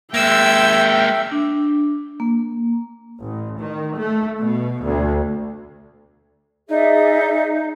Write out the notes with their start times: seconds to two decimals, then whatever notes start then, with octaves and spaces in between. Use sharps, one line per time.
0.14 G#3 A#3 E5 G5 E6 G#6
1.32 D4
2.20 A#3
3.21 A1
3.60 D#3
3.97 A3
4.38 B2
4.83 D2
6.69 D#4 G#4 D5 E5